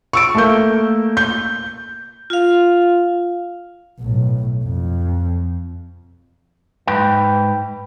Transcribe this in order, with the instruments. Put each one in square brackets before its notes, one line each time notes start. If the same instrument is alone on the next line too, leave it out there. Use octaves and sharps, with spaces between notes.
[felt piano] C#6 E6 D7
A3 A#3 G6
G6
[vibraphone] F4 F5
[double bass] B1 A2
F2
[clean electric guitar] G#2 B4 G5